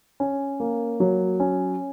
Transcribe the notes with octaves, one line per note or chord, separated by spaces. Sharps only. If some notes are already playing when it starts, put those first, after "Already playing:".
C#4
A#3
F#3
C#4